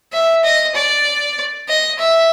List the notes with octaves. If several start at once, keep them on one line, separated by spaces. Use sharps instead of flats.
E5
D#5
D5
D#5
E5